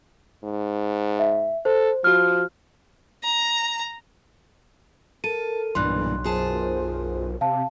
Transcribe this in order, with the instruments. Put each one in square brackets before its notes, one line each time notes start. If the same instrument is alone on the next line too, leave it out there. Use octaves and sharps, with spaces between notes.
[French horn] G#2
[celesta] E5
[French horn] A4 [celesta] C5
[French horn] F3 [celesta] F#4 F6
[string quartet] A#5
[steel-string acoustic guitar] A4 [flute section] A#4 [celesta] D#7
[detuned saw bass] B1 [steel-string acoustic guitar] G2 A#2 E3 [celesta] C6 F#6
[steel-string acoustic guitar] F#2 G#4 A5 [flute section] F4 A#4 C5
[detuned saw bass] C3 [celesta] F5 A5